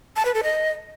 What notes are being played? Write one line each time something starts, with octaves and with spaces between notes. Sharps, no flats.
A5
B4
A4
D#5